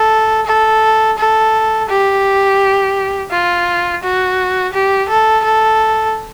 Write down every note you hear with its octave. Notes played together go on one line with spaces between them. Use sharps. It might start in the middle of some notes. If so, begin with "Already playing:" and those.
Already playing: A4
A4
A4
G4
F4
F#4
G4
A4
A4